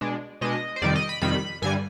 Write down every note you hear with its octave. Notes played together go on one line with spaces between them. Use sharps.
B2 G#3 D4
B2 G#3 D4 D#5
C5
F2 C3 D#3 G3 D5
D#5
B5
F2 C3 D#3 G3 B5
G2 D3 G3 G#5